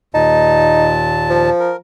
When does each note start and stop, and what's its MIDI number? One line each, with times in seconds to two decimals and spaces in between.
0.14 1.50 39
0.14 1.50 46
0.14 0.91 63
0.14 1.50 81
1.30 1.72 53
1.60 1.76 70